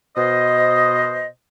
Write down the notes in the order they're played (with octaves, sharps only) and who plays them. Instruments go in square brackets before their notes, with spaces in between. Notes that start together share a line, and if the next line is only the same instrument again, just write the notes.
[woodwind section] B2 C5 D#5